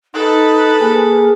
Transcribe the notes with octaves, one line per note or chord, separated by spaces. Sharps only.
D#4 A4 B4 F#6
A#3 G#4